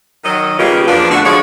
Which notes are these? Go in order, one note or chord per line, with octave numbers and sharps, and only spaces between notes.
D#3 F#3 D#5
C#3 G3 A#3 B3 F4 G4
E2 F3 A#3 D4 B4
D3 A3 D4 F#4
D3 F3 G#3 C#5 D5